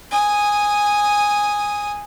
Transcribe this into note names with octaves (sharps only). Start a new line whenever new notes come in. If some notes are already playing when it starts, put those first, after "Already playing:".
G#5 D#6